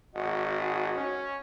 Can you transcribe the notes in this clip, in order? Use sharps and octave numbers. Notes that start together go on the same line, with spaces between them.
G#1 F#4 D#5 F#5
C#4